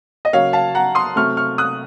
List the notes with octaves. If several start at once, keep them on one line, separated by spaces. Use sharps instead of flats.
D#5
C#3 F#3 A#3 C#4 C#5 F5
F5 A5
F#5 A#5
C6 D#6
C3 F#3 A3 C4 C#6 F6
C#6 F6
D#6 F#6